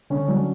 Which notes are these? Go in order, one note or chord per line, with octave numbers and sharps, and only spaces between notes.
D3 C#4
F#3 D4